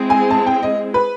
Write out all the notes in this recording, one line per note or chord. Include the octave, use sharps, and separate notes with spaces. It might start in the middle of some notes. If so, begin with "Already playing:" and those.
Already playing: G#3 C4 E4 G#4
G#5
A5
G5
D#5
B4